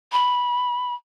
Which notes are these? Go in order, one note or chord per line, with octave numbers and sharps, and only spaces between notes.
B5